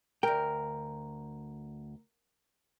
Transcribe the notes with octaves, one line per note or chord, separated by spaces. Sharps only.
D2 A#4 G5